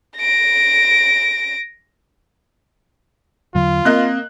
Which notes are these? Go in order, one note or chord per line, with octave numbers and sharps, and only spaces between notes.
A#6 D7
E2 D3 F#3 F4
A#3 C4 D#5 F#6